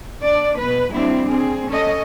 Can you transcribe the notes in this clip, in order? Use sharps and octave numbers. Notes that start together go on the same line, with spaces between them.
D4 D5
B2 B4
G3 C4 D4 E4
C4 G#4
C#4 A4 D#5